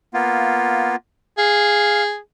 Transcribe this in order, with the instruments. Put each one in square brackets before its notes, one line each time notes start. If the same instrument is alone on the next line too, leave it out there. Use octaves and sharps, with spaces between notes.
[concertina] A#3 B3 F4
[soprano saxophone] G#4 [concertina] F5